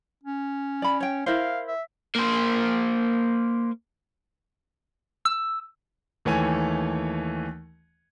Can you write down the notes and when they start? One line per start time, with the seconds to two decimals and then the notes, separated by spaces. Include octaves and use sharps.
0.23 C#4
0.82 D5 B5
1.00 C#5 G5
1.26 E4 A#4 C5 F5
1.68 E5
2.15 A#3 C5
5.25 E6
6.25 D#2 E3 A3 C#5 G#5